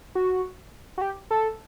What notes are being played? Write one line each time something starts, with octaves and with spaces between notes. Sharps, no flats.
F#4
F#4
G4
A4